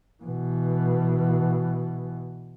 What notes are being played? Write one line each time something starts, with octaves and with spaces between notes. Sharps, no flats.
B2 E3